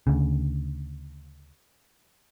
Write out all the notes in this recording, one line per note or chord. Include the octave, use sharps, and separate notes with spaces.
D2 C#3